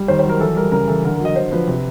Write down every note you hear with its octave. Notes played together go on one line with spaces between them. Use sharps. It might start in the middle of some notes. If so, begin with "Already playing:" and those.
Already playing: G3
D#3 C5
C5
F#3
A#4
E3 A4
G3 A#4
C#3 A#4
E3 A4
D3 A#4
A#4
F#3 D#5
D3 C5
F3 B4
C3